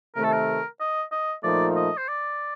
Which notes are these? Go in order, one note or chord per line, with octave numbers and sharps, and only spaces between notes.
C3 D#3 A3 A#4
A4
A#4
D#5
D#5
A#2 F3 A3 D#4 A#4 D5
D#5
C5
D5